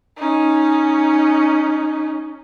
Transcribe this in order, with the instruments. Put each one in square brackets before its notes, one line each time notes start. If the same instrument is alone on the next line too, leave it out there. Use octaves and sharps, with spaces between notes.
[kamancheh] C#4 D#4